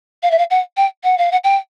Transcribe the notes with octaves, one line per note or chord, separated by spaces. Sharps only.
F5
E5
F5
F#5
G5
F#5
F5
F#5
G5